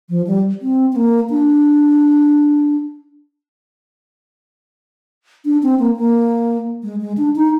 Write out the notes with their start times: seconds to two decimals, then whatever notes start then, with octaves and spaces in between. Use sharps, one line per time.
0.09 F3
0.27 G3
0.62 C4
0.92 C4
0.96 A#3
1.30 D4
5.45 D4
5.63 C4
5.79 A#3
5.97 A#3
6.83 G#3
7.01 G#3
7.17 D4
7.36 D#4